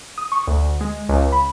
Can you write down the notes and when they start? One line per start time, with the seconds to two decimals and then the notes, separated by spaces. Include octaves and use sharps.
0.18 D#6
0.32 C#6
0.47 D2
0.81 G#3
1.09 C#2
1.32 B5